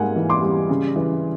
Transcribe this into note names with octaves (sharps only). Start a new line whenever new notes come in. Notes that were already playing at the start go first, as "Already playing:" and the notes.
Already playing: G#2 G3 A#3 F#5 G#5
E3
C6 D6
G3
C#3
E3